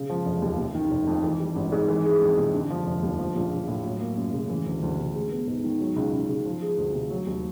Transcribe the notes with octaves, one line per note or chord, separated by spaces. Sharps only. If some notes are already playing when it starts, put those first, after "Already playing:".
Already playing: C#3
F3
F1
D#2
C3
D#3
F1
F2
E3
G3
G#1
G#2
E3
G#3
F2
C3
D3
F3
F1
D#2
F3
A#1
A#1
A2
F#3
A#3
F#2
C#3
E3
D2
D2
C3
G#3
B3
G#2
D#3
F#3
C#2
C#2
C#3
F3
G#3
D2
C3
F#3
D#2